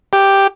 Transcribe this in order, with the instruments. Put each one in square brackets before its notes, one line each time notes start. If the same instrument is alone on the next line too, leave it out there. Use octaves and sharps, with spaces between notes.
[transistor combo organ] G4